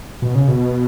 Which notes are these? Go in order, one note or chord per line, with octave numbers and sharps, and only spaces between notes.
B2
C#3
B2